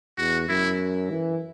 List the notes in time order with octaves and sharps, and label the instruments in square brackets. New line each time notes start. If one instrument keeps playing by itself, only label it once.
[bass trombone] E2 [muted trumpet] F#4
[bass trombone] F#2 [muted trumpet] E4
[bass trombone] E3